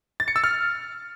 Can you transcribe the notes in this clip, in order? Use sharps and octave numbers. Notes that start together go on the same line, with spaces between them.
A6
C#7
E6
F6